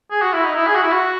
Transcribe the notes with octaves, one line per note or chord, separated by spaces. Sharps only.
G#4
F#4
E4
D#4
E4
G#4
F#4
E4
F#4